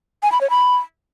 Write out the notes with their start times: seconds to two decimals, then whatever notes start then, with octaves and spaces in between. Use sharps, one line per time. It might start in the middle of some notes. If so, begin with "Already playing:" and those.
0.23 G#5
0.32 B5
0.41 C#5
0.50 B5